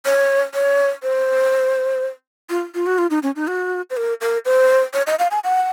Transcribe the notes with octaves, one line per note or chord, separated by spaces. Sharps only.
C#5
C#5
C5
F4
F4
F#4
F4
D#4
C#4
D#4
F#4
C5
A#4
A#4
C5
C#5
D#5
F5
G#5
F#5